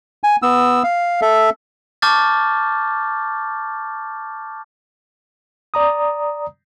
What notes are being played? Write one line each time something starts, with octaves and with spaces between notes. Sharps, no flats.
G#5
B3 E6
F5
A4 E5
A5 C#6 D6 F6 G6 A6
D5 A#5 D#6